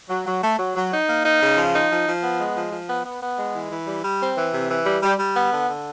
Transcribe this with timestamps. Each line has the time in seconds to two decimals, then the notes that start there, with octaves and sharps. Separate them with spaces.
0.10 F#3
0.26 F#3
0.43 A3
0.59 F#3
0.76 F#3
0.92 D#4
1.08 A#3
1.24 D#4
1.42 C#3
1.57 F3
1.74 D#4
1.90 F3
2.07 F3
2.23 B3
2.40 G#3
2.57 F3
2.72 F3
2.89 B3
3.05 B3
3.22 B3
3.38 G#3
3.54 E3
3.71 E3
3.87 G3
4.04 G3
4.21 C4
4.37 E3
4.53 C3
4.70 E3
4.86 G3
5.03 G3
5.18 G3
5.35 B3
5.51 D3
5.68 D3